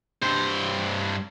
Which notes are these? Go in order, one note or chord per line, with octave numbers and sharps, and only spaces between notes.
G2 C5